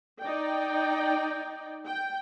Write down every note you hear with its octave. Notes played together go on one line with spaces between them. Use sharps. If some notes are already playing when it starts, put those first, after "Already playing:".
D#4 D5 G5
G5